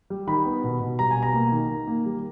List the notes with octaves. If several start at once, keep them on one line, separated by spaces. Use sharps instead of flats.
G3
D#3 B5
B3
B2
B2
G3 A#5
G#5
B2
A#5
A#3
D#3
D#3
A#3
G3